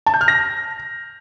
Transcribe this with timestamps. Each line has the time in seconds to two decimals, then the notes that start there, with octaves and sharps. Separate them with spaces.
0.06 A5
0.14 G6
0.21 F6
0.28 A#6